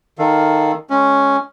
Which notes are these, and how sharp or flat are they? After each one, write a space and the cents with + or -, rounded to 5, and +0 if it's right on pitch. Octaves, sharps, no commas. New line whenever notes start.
D#3 +0 A4 +10 F5 +0
G#3 +0 C#4 +0